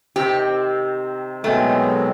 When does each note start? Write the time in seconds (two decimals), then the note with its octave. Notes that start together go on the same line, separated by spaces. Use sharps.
0.16 C3 D#3 C4 G4
1.44 B2 D#3 F#3 G#3 A3 C4